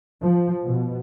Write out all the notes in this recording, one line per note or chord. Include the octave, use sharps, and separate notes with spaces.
F3
B2